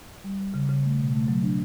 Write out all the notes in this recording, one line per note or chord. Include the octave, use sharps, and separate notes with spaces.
G3
G3
C#3
C#3
A3
B2
A3
F#3
D4